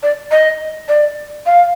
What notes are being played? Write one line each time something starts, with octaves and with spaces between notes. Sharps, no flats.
D5
D#5
D5
F5